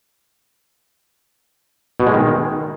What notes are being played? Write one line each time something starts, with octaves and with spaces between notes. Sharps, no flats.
B2
G#3
D#3